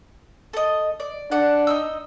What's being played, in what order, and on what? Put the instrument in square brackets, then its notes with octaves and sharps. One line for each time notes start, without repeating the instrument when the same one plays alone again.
[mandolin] A4 D#5
D5
[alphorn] D4 [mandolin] A4 D5 F#5
[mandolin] D#4 D#5 E6